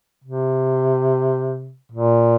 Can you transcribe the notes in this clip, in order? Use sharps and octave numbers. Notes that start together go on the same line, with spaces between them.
C3
A#2